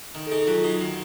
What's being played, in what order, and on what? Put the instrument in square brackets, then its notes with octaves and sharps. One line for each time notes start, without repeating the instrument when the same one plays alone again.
[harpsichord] D#3
[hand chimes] A4
[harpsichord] D#4 [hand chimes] G#4
[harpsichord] F#3 [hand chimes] F4
[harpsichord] D#4 [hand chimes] F#4
[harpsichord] D#3 [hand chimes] F#4